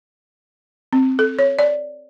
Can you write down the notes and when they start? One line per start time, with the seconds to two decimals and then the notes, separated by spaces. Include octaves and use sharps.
0.93 C4
1.19 A4
1.39 C#5
1.59 D5